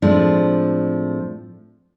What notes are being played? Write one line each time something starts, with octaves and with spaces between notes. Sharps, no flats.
A2 F3 G#3 C4 D4